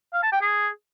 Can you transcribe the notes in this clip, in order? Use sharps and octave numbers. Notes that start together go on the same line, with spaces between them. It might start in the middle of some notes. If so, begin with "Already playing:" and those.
F5
A5
G5
G#4